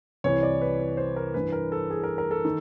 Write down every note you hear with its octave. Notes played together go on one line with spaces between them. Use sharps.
C2 C3 E3 C#5
D5
B4
B4
C5
A#4
G2 E3 B4
A#4
A4
G#4
A#4
A#4
A4
D#3